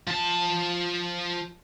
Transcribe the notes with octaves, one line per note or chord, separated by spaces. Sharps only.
F3 A5